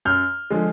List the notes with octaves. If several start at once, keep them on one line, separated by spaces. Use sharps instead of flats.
F#2 F6 G6
D3 F3 G#3